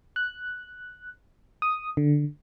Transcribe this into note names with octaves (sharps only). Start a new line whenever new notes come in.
F#6
D#6
D3